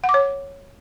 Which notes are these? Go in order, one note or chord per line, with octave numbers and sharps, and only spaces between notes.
F#5
D6
C#5